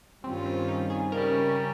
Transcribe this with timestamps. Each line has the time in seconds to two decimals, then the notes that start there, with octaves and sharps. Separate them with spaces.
0.24 G2 D#3 G3 C4 C#4 F4
0.46 C4
0.68 D#4
0.90 G#4
1.12 C#3 G3 C#4 A#4